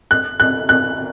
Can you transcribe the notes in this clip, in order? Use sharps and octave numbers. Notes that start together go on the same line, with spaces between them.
F#6
F#6
F#6